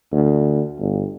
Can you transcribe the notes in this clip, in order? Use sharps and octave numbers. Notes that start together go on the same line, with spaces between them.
D2
G1